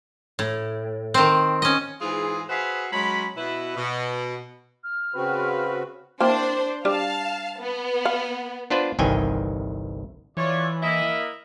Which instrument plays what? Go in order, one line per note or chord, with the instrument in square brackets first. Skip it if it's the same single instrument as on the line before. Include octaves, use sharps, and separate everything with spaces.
[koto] A2
D#3 C4
C#4 D#5
[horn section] G#2 E3 G#3 F4 G#4
F#4 G#4 B4 C5 E5 F5
F#3 G#3 C#4 B5
B2 E4 B4
B2
[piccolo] F6
[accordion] C#3 C4 F#4 [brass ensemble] B4
[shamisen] A#3 C4 E4 [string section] D4 C5
[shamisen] G3 D4 D5 [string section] F5 A5
[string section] B3
[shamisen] F5
[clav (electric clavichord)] B3 D4 F4 B4 C5
G1 C2 D#3 E3 G5 G#5
[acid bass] E3 [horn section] F4 C#5 D5
[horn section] A#3 E4 D#5